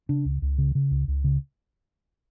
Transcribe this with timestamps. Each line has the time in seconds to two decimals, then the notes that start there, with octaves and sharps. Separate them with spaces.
0.09 C#3 D4
0.25 C#2
0.42 C#2
0.58 C#3
0.75 C#3
0.91 C#2
1.08 C#2
1.24 C#3